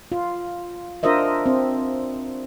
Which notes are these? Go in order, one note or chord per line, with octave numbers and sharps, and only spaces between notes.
F4
D4 F4 A#4 C5 D#5 E5
C4